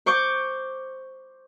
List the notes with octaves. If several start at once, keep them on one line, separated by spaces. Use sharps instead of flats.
C5 C#6 D6 G6